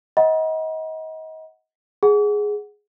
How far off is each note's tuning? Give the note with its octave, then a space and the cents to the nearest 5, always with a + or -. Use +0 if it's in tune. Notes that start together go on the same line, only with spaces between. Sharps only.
D#5 +30 F#5 +0 B5 -45
G#4 +0 F#5 +0